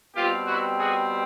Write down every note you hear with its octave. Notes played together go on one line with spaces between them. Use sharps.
B2 G3 C4 F4 G4
E4 F#4
F#4 G#4